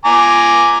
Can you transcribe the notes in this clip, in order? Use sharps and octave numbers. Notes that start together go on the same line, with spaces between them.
G#5 A#5 D6